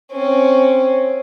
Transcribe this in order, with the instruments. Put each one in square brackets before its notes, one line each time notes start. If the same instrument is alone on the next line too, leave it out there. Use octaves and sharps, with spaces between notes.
[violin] C4 C#4